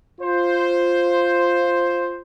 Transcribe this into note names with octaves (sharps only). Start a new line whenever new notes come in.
F4 C5